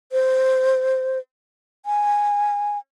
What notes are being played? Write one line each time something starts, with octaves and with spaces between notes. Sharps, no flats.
C5
G#5